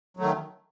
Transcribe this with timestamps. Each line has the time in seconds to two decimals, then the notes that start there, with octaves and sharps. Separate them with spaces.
0.17 F#3
0.20 A3
0.22 D#3